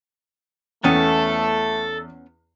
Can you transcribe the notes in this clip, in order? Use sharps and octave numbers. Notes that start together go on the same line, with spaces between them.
E2 A3 B3 C#4 A4 G5